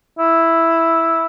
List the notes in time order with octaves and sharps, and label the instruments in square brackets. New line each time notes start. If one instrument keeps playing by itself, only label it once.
[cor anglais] E4